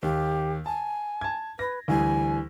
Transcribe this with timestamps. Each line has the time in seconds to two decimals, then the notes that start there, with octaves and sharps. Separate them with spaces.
0.03 D#2 G4
0.66 G#5 A5
1.21 A5 G#6
1.59 B4 A#6
1.88 D2 E3 G3 G#5